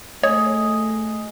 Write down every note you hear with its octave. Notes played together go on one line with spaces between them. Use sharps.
A3 G#4 C#5 D#5